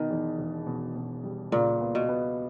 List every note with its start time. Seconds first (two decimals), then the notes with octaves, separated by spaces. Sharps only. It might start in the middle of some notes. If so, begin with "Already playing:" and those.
Already playing: B2 D#3
0.11 E2
0.38 E1
0.67 B2
0.96 B2
1.24 G3
1.52 C#2 A#2
1.81 B3
1.95 B2
2.09 B3